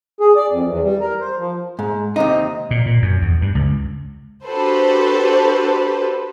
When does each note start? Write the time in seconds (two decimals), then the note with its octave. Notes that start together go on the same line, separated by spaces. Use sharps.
0.20 G#4
0.36 D5
0.51 F2
0.68 E2
0.84 G3
1.00 A#4
1.21 C5
1.38 F3
1.79 G#2
2.16 D#2 C3 D#4
2.71 A#2
2.86 A#2
3.02 F#2
3.22 E2
3.41 G2
3.55 C#2
4.46 D4 F#4 G4 A4 B4 C5